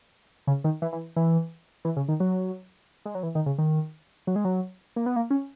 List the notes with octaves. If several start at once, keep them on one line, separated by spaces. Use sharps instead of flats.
C#3
D#3
E3
E3
E3
E3
C#3
D#3
F#3
G#3
F#3
E3
D#3
C#3
D#3
F#3
G#3
F#3
A#3
B3
A#3
C#4